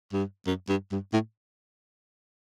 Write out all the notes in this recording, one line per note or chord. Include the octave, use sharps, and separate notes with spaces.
G2
F#2
G2
G2
A2